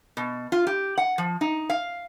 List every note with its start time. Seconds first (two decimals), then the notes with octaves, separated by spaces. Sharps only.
0.17 B2
0.52 F4
0.67 G4
0.98 F#5
1.18 F3
1.41 D#4
1.70 F5